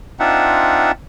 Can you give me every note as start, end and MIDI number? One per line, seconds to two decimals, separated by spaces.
0.20 0.92 60
0.20 0.92 62
0.20 0.92 63
0.20 0.92 65
0.20 0.92 76
0.20 0.92 78